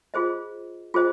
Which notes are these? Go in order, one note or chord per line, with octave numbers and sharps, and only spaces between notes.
F4 G#4 C5 D#5
F4 G#4 C5 D#5